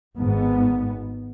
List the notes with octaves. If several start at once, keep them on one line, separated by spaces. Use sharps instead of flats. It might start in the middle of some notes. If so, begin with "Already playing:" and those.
G#1 G#2 B3